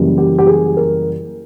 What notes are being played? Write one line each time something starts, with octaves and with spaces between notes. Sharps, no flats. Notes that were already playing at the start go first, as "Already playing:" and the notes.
Already playing: F#2 C#3 E3 G3 A#3
G4
G4
G#4
A#4